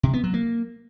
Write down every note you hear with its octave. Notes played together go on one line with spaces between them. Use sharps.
C3
B3
F#3
A#3